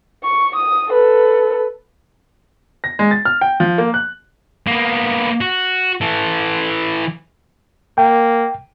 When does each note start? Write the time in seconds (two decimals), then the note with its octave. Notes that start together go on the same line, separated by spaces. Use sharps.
0.24 C#6
0.56 D#6
0.91 A4 B4
2.84 A#6
2.99 G#3
3.11 A6
3.25 F6
3.41 G5
3.60 F3
3.78 A#3
3.94 F#6
4.67 A#3 B3
5.41 F#4
6.01 E3 A4
7.98 A#3 G5